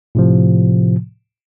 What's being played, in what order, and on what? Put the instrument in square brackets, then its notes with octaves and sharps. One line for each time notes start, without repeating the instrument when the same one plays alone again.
[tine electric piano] A2 C3 F3